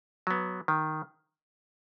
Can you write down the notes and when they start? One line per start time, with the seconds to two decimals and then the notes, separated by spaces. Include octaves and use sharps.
0.27 F#3 B3
0.68 D#3